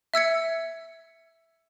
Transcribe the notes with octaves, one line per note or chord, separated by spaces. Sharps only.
E5 E6 G#6 C#7